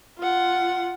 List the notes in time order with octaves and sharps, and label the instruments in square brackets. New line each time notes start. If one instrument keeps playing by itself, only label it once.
[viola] F4 F#5